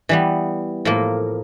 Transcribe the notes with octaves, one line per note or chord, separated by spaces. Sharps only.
E3 G3 B3
A2 F3 A#3